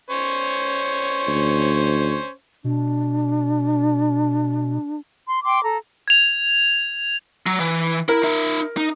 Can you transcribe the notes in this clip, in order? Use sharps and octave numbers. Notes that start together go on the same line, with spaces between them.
C#4 C5 C#5
D2
B2 D4
C6
G5 C6 D6
A4 A#5
G#6 F7
F#3
E3
E4 A#4
D#4 E5
D#4